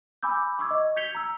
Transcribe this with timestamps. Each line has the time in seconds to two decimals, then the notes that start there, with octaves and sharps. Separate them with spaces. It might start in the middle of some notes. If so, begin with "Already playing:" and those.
0.23 G#5 B5 D6 E6 G6
0.59 C#6 D6 E6 G#6
0.71 D#5
0.96 G6 G#6 B6 C#7 F7 G7
1.15 A#5 E6